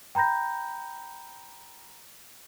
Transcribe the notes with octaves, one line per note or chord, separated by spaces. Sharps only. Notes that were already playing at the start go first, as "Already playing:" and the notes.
G5 A#5 B5 G6 A#6